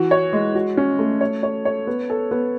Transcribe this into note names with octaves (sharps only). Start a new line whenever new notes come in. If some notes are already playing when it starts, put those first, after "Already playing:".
Already playing: E3 F#4
C#5
G#3
F#4
C#4
A3
C#5
C#5
C#5
B3
A4
B3